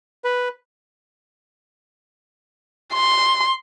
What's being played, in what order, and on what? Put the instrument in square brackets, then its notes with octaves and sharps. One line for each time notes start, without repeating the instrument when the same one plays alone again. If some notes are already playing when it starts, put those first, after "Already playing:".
[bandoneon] B4
[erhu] C6